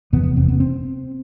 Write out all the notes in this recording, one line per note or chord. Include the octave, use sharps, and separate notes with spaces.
F1 E2 C3 B3
B3
C4
B3
C4